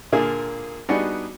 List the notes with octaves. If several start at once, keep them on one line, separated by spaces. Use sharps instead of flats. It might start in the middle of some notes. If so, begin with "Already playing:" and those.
A#2 D3 A#3 F4 G#4
G3 B3 D4 D#4 F#4 G#4